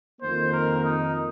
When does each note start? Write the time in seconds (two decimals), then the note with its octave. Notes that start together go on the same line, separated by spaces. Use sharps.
0.21 F2 D#3 A#3 C5
0.53 A#4
0.83 D#4